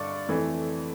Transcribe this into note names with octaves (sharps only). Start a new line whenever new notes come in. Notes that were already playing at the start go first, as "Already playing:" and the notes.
Already playing: G2 D3 D5 C#6
F2 E3 A3 E4